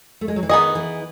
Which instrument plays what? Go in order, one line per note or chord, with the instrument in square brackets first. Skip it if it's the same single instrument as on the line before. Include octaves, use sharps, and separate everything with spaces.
[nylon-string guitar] A3
G#3
F#3
E3
[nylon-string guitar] D#3 [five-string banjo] B3 D#4 G#4 D#5
[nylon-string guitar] E3